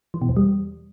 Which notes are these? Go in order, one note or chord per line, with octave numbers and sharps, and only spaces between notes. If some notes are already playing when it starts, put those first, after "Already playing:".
E3
B2
E2
G3